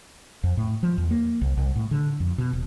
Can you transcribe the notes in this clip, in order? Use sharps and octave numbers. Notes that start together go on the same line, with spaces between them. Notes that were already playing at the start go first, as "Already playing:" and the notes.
F2
A2
F3
E2
A#3
C2
C2
A2
D3
F2
B2
D#1